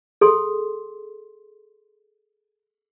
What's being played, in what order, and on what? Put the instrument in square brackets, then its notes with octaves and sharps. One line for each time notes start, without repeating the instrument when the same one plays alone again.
[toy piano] G#4 A4 C6